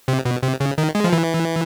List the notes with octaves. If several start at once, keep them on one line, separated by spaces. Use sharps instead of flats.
C3
B2
C3
C#3
D#3
G#3
F3
E3